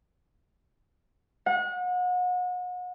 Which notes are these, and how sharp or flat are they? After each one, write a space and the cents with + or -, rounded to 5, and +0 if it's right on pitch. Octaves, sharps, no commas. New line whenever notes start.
F#5 -35